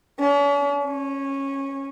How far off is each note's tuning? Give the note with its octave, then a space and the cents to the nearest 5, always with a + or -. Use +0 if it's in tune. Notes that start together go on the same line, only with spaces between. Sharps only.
C#4 +45
C#4 -15